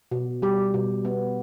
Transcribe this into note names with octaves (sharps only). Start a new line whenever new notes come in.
B2
G3 G4
B2
B3